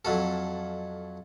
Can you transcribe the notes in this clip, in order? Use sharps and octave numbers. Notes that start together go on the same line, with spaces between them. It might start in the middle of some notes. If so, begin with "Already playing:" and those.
F2 F#3 A4